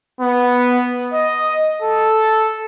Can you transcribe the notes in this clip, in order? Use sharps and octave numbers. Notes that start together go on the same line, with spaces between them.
B3
D#5
A4